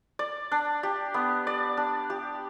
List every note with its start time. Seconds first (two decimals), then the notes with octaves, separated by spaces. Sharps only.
0.19 D5
0.52 D4
0.83 G4
1.14 B3
1.47 D5
1.77 D4
2.10 G4